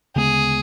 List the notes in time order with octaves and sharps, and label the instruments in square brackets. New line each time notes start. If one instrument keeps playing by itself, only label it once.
[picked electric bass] D2 C#3 G#3 B3 [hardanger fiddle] G#4